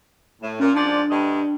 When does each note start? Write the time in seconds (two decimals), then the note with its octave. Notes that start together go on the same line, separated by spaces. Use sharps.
0.41 A2
0.59 A#2 C#4
0.75 G#2 F3 D4 D5
1.09 D2 G2 D#5